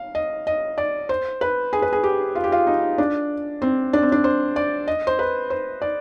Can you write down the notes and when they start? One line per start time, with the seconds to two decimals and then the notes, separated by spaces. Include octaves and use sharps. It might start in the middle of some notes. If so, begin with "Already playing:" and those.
Already playing: F5
0.15 D#5
0.47 D#5
0.78 D5
1.09 C5
1.41 B4
1.73 G#4
1.82 B4
1.93 G#4
2.03 G4
2.35 F4
2.44 G4
2.52 F4
2.67 D#4
2.98 D4
3.62 C4
3.93 D4
4.02 C4
4.12 D4
4.24 C5
4.56 D5
4.88 D#5
5.07 C5
5.19 B4
5.50 C5
5.82 D5